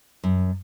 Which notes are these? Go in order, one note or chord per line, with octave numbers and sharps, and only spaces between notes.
F#2